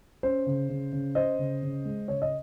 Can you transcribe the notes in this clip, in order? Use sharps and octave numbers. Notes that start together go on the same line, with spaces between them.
C#4 C5
C#3
C#3
C#3
C#4 C5 D#5
C#3
C#3
G#3
C#3 C#5
D#5